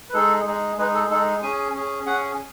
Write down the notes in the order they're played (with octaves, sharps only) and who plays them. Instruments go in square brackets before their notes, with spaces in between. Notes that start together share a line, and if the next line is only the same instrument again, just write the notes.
[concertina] B4
G#3 D#4 G#4 A4
G#3 D#4 G#4
G#3 D#4 G#4 B4
A4
G#3 D#4 G#4 A4
C#4 G#4 G#5
C#4 G#4
C#4 G#4 F#5